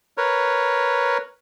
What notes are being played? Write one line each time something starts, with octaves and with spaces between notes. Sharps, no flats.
A#4 B4 C#5